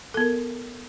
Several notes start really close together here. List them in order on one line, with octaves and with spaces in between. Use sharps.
A4 B3 A#4